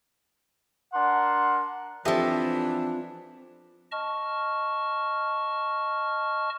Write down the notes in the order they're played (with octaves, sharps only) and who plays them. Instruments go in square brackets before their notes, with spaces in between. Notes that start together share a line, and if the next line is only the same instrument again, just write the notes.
[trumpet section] D4 A#4 C6 [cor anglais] F#5
[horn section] E3 D4 [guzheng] F3 D#5 [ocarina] C4 [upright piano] G4 A4 E5
[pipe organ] D#5 A5 C#6 F6